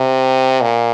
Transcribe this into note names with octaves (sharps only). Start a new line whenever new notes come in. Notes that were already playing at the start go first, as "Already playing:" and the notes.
Already playing: C3
A#2